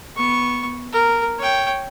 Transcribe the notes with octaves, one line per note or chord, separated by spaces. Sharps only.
B3 C#6
A#4
C#5 G5